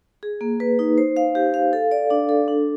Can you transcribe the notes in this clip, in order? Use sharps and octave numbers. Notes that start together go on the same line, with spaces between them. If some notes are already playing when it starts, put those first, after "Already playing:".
G#4
A#3
B4
D#4
C5
F5
G4
F5
A4
D5
D4
A4
D4